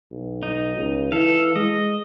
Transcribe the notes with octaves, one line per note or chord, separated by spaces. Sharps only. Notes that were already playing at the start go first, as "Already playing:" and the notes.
B1
D#4
C#2
E3 A4 F5
G#3 D#5